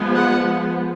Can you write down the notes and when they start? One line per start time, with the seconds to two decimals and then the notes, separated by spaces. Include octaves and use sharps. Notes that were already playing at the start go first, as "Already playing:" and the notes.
Already playing: F3 G#3 B3
0.15 F#5